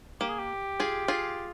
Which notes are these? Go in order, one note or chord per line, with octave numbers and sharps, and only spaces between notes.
A#3 G4
G#4
G4
F4 G#4
F4 G#4